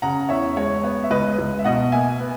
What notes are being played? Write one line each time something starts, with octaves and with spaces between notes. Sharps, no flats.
C#3 F#5 A#5
E2 C#5 E5
G#3 C#5
B3 C#5
E5
C#2 B4 D#5
C#2
E5
B2 D#5 F#5
A#3 E5 G#5
B3